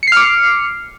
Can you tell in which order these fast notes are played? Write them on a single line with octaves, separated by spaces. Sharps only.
C#7 C7 F6 D6